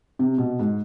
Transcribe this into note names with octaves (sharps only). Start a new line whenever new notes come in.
C3
B2
G#2